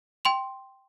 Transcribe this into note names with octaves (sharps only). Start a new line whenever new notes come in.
G5 C6 F7